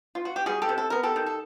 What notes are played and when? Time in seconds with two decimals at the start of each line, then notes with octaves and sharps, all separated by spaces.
0.15 F4
0.25 F#4
0.36 G4
0.46 G3 F#4 G#4
0.62 G4 A4
0.69 C3
0.78 A4
0.90 B3 A#4
1.03 G4 A4
1.16 D#3
1.26 A4